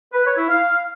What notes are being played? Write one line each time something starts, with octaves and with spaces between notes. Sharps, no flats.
B4
C#5
E4
F5